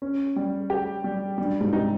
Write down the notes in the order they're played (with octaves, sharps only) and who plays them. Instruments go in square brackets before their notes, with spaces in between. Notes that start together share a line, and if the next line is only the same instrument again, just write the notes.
[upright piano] C#4
G3
G4
G3
[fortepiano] G2 [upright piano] G3
[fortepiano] G#2
[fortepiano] C3 [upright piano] D#4